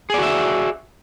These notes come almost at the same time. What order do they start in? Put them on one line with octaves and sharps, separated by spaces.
G#4 D5 F#4 E5